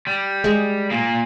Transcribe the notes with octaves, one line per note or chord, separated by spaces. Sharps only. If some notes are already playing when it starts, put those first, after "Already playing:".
G3
G#3
A#2 A#3